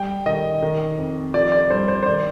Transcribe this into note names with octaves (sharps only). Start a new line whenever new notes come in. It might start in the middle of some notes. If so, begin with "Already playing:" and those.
Already playing: G3 G5
D#3 D#5
D#3
F2
F3 D5
D5
G2 C5
C5
C5
D#3 D5